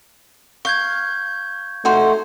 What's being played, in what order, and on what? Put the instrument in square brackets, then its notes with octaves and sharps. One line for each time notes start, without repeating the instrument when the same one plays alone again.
[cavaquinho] F5 [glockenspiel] C#6 G6 G#6
[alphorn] A3 [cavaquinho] D#4 F#4 C5